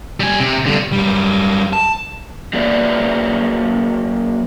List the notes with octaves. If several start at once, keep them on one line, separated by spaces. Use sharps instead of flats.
G3 G#5
C3
G2 D3
F#2 G3
A5
F#3 A#3 G#4 B4 D5 E5